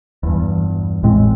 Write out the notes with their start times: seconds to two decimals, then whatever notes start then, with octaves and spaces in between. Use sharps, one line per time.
0.23 E2 G2
1.03 A1 A2 G#3 C4